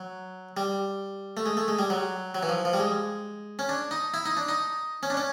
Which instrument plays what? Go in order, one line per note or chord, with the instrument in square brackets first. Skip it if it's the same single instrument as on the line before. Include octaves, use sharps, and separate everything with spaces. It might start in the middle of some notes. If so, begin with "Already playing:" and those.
Already playing: [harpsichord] F#3
G3
A3
G#3
A3
G#3
G3
F#3
F#3
E3
F3
F3
G3
G#3
C#4
D4
D#4
E4
D#4
D4
D#4
C#4
D4
C#4